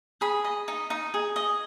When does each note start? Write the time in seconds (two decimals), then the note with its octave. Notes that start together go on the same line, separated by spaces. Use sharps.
0.21 G#4 B5
0.44 D#5
0.68 D#4
0.90 D#4
1.14 G#4
1.36 D#5